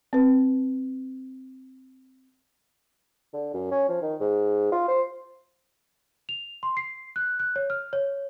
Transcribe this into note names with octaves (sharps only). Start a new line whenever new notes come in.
C4 B4
D3
F#2
C#4
F3
D#3
G#2
F4
C5
F7
C6
C7
F#6
F#6
C#5
F6
C#5